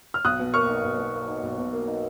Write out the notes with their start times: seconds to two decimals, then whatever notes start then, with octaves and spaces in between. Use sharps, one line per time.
0.14 F6
0.25 B1 D#6 F#6
0.39 B2
0.54 A#3 C#6 F6
0.69 D#4
0.84 B1
0.98 B2
1.14 A#3
1.28 D#4
1.43 B1
1.58 B2
1.73 A#3
1.88 D#4